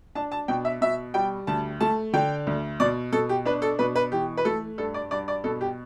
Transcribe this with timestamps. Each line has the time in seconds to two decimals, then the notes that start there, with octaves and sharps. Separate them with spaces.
0.15 D4 A5
0.32 A5
0.48 B2 G5
0.65 E5
0.81 B2 E5
1.14 G3 G5
1.47 D2 A5
1.81 A3 A5
2.13 D3 G5
2.47 D2
2.80 B2 D5
3.13 B2 A4
3.29 G4
3.45 D4 B4
3.62 A4
3.79 B2 B4
3.96 B4
4.12 E3 G4
4.37 B4
4.45 A3 A4
4.78 G2 A4
4.94 D5
5.11 G2 D5
5.28 D5
5.44 B2 A4
5.61 G4